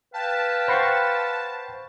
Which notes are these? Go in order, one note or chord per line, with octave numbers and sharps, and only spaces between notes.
B4 F5 G5 A5
C5 F#5 B5 C#6 A#6 C7